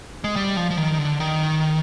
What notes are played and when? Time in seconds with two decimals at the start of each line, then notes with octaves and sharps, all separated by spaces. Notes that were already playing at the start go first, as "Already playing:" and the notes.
0.24 G#3
0.36 G3
0.57 F3
0.70 F3
0.77 D#3
0.98 D3
1.20 D#3